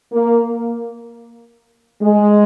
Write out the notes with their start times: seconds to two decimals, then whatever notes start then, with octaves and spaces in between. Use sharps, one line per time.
0.12 A#3
2.01 G#3